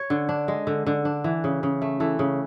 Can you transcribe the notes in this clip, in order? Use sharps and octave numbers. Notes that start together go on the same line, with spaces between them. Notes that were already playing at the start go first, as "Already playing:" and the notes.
Already playing: C#5
D3
D4
G#3
D3
D3
D4
E3
C#3
C#3
A3
E3 A4
C#3